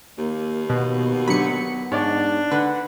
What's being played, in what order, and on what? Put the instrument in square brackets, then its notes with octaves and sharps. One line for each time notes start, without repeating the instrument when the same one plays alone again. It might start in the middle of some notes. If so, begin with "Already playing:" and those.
[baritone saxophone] D#2 [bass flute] A#3
[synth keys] B2 [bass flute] B3
[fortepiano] D3 F#3 [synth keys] B5 C#7
[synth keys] G#2 [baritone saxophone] D4 [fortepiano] C#5 D5
[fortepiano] D3 [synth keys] B4 [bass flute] F#5